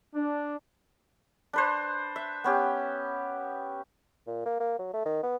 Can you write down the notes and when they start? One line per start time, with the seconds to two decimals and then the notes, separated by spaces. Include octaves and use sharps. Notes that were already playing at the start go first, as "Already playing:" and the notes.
0.15 D4
1.53 D4 B4 C5
2.16 E5
2.44 B3 C#4 G4
4.27 A#2
4.46 A#3
4.60 A#3
4.79 F#3
4.93 A3
5.05 D#3
5.23 B3